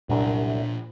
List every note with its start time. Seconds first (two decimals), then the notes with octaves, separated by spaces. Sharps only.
0.09 C2 F#2 A#2 D4